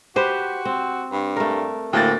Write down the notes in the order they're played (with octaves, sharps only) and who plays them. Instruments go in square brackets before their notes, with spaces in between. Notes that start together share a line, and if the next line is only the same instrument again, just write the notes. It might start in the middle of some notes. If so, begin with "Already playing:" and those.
[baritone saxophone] F#4 [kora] G4 B4 C5
[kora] C4
[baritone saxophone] G2
[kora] A3 A#4
[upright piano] D2 A#3 A6 [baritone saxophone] A2